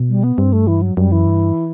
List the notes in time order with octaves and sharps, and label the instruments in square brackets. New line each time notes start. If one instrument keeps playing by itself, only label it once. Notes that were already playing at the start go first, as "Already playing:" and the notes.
Already playing: [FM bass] B2
[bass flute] G3
B3
[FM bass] G2 [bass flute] C4
[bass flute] A3
E3
F#3
[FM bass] F#2 [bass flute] G3
[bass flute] E3
[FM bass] G2